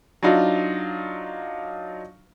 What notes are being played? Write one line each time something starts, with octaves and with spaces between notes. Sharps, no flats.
F#3 D4 D#4 F4